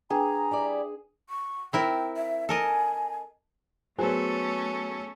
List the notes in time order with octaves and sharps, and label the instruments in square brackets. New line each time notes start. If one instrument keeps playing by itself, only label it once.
[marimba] D4 B4 G5 [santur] G#4 [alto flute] A#5
[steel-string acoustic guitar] G3 E4 D5
[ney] C#6
[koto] C4 E4 A#4 [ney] G5
[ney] E5
[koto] A4 A#4 D#5 [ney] G#5
[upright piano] F#3 B3 [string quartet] A3 C#4 A4 [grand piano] G#4 C5 G#5